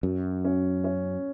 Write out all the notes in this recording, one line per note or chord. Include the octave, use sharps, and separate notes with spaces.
F#2 F#3
C#4
C#4